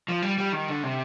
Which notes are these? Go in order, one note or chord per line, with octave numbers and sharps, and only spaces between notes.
F3
G3
G3
D#3
D3
C3